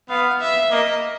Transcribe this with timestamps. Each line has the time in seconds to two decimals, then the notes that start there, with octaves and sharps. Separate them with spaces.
0.10 B3 F5
0.41 E5
0.72 A#3 D#5